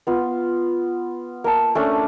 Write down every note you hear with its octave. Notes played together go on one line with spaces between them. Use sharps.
B3 F4
A#3 A5
A3 C#4 D4